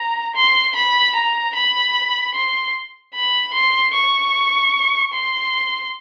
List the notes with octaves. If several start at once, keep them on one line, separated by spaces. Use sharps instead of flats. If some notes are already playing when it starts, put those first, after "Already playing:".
Already playing: A#5
C6
B5
A#5
B5
C6
B5
C6
C#6
C6